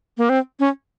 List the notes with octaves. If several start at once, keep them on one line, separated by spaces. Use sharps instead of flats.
A#3
C4
C#4